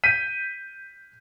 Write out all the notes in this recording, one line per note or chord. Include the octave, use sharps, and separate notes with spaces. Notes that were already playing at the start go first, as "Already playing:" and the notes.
G6 B6 D#7